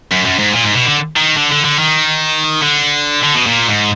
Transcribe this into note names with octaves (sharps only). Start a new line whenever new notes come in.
F#2
F#2
G#2
A#2
G#2
B2
D3
D#3
D3
D3
D3
D#3
D3
D3
B2
A#2
G#2